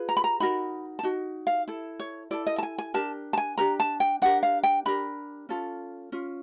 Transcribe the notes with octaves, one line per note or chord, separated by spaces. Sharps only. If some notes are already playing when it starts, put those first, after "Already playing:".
Already playing: F4 G#4 B4
A#5
B5
A#5
D#4 F#4 A#4 B5
A5
D#4 F#4
F5
E4 A4
C#5
E4 A4 D5
D#5
A5
G#5
G#5
D4 G4 A#4 A5
A5
G#5
D4 G4 A#4 A#5
A5
G5
D4 G4 A#4 F#5
F5
G5
D4 G4 A#4 B5
C#4 F4 A4
C#4 F4